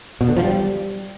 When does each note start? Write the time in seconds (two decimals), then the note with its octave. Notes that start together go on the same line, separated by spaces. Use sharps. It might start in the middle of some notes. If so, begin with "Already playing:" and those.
0.21 B2
0.29 D3
0.37 F3
0.44 G3